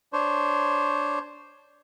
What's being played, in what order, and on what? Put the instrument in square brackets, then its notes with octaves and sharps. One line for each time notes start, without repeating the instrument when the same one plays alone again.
[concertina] D4 C5 C#5